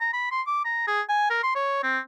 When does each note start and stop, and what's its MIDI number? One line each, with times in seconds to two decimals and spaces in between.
0.01 0.09 82
0.13 0.30 83
0.31 0.41 84
0.47 0.62 86
0.65 0.87 82
0.88 1.01 68
1.09 1.27 80
1.30 1.39 70
1.43 1.52 84
1.55 1.83 73
1.83 1.99 60